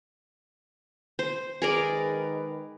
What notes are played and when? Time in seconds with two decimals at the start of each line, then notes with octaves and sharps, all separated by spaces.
1.19 C5
1.62 D#3 G#3 G#4 A#4 B4 D5